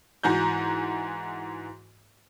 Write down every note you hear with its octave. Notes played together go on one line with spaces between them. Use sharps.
G#2 E3 F#4 A#5 G6